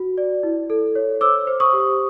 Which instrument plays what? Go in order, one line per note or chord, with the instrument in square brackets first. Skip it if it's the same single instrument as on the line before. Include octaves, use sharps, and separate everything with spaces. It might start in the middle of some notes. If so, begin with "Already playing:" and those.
Already playing: [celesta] F#4
D5
E4
A4
C#5
C5 D6 E6
C5
C#6 D#6
G4